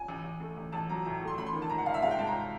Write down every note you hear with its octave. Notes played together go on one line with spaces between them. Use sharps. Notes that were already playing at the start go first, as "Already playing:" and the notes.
Already playing: G#5
A1
A1
A3
A1
A1 A5
F#3 A#5
A2 A#5
A3
C6
A1 B5
C6
D#3
A5
G#2 A#5
F#5
G#2 F5
E5
G#3 F5
G5
G#3 A5
A#5